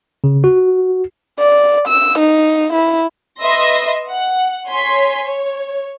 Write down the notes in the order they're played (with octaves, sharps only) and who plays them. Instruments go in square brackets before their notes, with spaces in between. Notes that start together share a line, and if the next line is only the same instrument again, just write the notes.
[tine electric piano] C#3
F#4
[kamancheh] D5
E6
D#4
E4
[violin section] B4 D#5 E5 C6 A#6
F#5
C#5 G#5 C6 B6
C#5